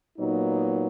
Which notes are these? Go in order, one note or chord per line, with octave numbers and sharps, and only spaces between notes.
A#2 F#3 B3 D#4